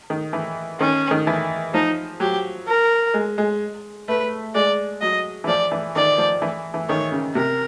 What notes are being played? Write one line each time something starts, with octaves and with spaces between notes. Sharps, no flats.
D#3
E3
D#3 C#4
D#3
E3
F3 D#4
F#3 G4
A#4
G#3
G#3
A3 B4
G#3 D5
F#3 D#5
E3
F3 D5
E3
D#3 D5
F3
E3
E3
D#3 C#5
C#3
C3 A#4